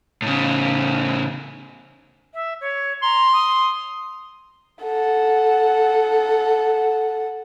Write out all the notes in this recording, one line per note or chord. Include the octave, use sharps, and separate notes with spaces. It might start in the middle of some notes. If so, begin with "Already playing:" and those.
A2 C#3
E5
C#5
A#5 C6
D#6
A4 F#5